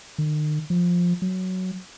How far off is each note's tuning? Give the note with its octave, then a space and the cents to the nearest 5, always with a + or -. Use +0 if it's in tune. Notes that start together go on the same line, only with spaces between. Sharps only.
D#3 -45
F3 +10
F#3 +5